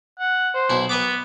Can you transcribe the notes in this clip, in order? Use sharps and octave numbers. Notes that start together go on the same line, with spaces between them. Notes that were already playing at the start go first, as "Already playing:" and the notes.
F#5
C5
B1 E4 F#4
B3 B4 E5 D6